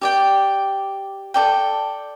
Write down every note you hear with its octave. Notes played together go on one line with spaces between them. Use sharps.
G4 D5 G5
A4 D5 G5